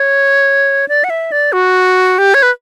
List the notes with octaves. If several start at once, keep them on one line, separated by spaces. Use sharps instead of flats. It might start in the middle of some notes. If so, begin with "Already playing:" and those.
Already playing: C#5
D5
F#5
E5
D5
F#4
G4
C#5
B4